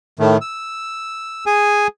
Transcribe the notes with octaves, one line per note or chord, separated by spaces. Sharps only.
A2 D#3 A3
E6
G#4 G#5